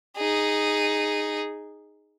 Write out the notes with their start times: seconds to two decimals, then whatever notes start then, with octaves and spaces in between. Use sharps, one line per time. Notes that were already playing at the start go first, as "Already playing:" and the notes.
0.17 D#4 G#4